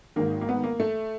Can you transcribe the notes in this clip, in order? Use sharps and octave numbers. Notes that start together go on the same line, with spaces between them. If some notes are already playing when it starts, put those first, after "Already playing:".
G#1 G#2 D#3 A#3
A#3
B3
A#3
A3